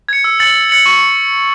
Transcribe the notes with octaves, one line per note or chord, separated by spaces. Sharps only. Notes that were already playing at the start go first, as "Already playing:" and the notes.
G#6 C#7
E6
A6 C#7 F#7
E6
A6 C#7 F#7
C#6